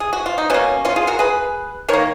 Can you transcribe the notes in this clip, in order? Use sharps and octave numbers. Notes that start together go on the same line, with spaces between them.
G#4
F#4
F4
D#4
B2 A#3 C#4
C#4 F4
F4 G#4
F#4 A#4
G#4 B4
D#3 A#3 A#4 C#5